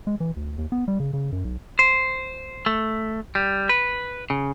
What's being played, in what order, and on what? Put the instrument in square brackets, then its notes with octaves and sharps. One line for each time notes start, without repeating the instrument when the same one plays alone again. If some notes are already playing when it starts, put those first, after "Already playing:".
[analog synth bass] G#3
E3
D2
D#2
B3
G3
C#3
C#3
F#2
B1
[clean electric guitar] C5
A3
G3
B4
C#3